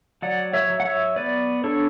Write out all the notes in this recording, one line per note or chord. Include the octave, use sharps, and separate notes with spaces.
F#3 D5 F#5
C#5 E5
F#3
F#5
C#5 E5
B3 B4 D5
D4 A4 C#5